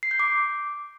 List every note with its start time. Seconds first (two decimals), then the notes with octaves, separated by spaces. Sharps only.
0.03 C7
0.11 G6
0.19 D6